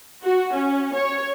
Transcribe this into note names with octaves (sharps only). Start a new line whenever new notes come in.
F#4
C#4
C#5